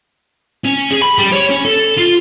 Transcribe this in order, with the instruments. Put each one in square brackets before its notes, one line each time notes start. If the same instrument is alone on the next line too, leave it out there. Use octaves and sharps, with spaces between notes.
[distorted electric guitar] C#4
G#4
B5
G3
C#5
C#4
A4
F4